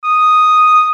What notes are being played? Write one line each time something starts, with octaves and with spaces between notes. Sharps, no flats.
D#6